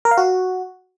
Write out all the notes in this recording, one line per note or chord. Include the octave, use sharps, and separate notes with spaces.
A#4
F5
F#4